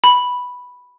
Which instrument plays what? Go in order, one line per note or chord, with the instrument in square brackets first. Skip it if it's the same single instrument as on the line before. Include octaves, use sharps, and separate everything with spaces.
[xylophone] B5